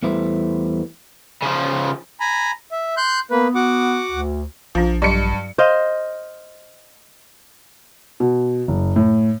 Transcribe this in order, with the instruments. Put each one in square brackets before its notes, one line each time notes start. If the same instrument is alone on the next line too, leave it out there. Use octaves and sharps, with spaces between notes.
[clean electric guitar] E2 G3 A3 E4 B4 C5
[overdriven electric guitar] C#3 F3
[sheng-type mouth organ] G#5 A#5 B5
E5
C6 F#6 G6
[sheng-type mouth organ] A#3 B4 [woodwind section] B3
[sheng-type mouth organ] F#4 F#5 D6
[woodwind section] D2
[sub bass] A#1 [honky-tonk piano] F3 [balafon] D4 F4
[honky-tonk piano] G2 C#7 [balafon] F#3 D#5 C6
[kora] C5 D#5 F5
[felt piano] B2
F#1
A2